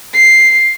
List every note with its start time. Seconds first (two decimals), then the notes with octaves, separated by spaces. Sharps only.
0.13 C7